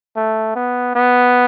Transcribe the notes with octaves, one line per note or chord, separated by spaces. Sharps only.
A3
B3
B3